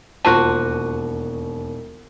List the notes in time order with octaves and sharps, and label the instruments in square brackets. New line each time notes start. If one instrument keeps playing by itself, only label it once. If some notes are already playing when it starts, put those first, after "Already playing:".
[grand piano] E1 D#2 C#6 [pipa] F3 A#3 F#4 [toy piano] F4 A5